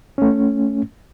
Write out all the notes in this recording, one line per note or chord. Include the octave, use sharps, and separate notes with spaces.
A3 C#4